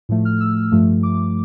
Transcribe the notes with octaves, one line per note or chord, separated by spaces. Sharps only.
A2 F3 A3
F6
E6
G2 F3 A3
D6